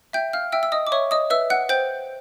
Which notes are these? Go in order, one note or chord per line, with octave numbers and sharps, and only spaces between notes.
E5 G5 G6
F5 F6
E5 G5 E6
E6
D#5 D#6
D6
C#5 E5 C#6
D#5 D#6
B4 E5 E6
F#5 F#6
C5 G5 G6